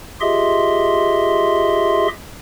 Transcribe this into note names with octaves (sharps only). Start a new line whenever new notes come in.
F4 G4 G#4 D#5 E5 C6